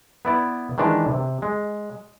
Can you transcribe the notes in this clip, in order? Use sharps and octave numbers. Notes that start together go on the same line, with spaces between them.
B3 E4 D5
D#3 E3 G#3 D4
C3
G#3